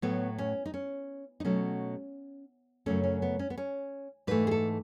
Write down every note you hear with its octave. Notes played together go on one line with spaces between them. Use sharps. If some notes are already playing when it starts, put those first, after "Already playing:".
A2 F#3 A3 B3
C#4
D#4
C#4
D#4
B2 F#3 A3 C#4
F#2 C#3 F#3 A3 C#4
C#4
B3
C#4
B3
C#4
G#2 E3 A3 B4
G#4
A4